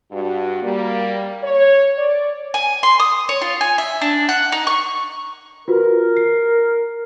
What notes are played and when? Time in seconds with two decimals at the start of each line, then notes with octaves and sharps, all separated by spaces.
0.12 G2 F#4
0.63 G3 A#3
1.44 C#5
1.98 D5
2.54 G#5
2.83 C6
3.00 D#6
3.29 C#5
3.42 F4
3.61 G#5
3.78 E5
4.02 D4
4.29 F#5
4.52 D#4
4.67 C#6
5.68 F4 F#4 A#4 B4
6.17 C7